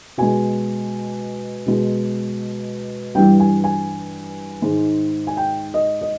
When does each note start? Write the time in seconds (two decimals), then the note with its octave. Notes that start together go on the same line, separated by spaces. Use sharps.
0.18 B2 G#3 G#5
1.66 B2 G#3
3.15 G2 E3 G3 G5
3.40 G#5
3.64 G#5
4.62 G#2 D#3 G#3
5.27 G#5
5.37 G5
5.74 D#5
6.01 D#5